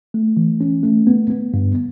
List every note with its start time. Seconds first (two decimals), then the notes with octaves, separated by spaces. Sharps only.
0.14 A3
0.37 E3
0.61 C#4
0.83 A3
1.07 B3
1.30 B3
1.54 G2